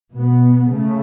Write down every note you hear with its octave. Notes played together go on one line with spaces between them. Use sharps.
B2 B3
C#3 A3